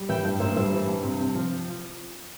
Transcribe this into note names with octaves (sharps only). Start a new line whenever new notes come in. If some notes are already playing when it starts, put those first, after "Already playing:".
Already playing: G3
E3 E5 G5
G2
A#3 C5 E5
G3 C5 E5
E3
G2
C3
C4
F3